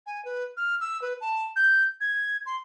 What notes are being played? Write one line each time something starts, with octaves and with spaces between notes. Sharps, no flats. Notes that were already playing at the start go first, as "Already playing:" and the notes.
G#5
B4
F6
E6
B4
A5
G6
G#6
C6